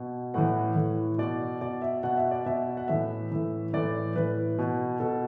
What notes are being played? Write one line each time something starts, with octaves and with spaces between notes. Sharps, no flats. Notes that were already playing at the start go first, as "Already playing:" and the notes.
Already playing: B2
A2 E3 F#5
A2 E3
B2 D5
B2 D5
E5
B2 F#5
E5
D5
B2 E5
F#5
A2 E3 E5
A2 E3
A2 E3 D5
A2 E3 B4
B2
B2 A4